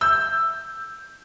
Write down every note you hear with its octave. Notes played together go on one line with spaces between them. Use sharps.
E6 G6